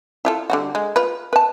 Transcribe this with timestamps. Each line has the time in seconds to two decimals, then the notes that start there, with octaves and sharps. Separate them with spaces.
0.25 E4 F4 A4
0.50 D3 G3 F#4
0.75 G#3
0.96 F4 B4
1.33 B4 A5